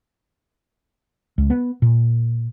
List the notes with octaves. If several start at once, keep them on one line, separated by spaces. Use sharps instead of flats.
C#2
B3
A#2